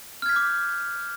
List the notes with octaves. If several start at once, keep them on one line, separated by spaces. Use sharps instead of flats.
D6 F6 G6 G#6 B6